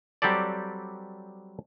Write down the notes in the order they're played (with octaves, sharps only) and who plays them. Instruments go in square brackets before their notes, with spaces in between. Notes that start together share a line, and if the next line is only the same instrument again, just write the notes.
[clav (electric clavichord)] F#3 G3 C4 G4 A4 D5